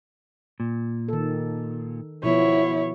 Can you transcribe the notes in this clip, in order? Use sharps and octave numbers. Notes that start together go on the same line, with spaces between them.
A#2
D#3 A4
B2 F3 B3 E4 C#5